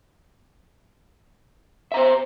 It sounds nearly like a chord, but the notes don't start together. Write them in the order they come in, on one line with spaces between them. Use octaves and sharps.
E5 A#5 C5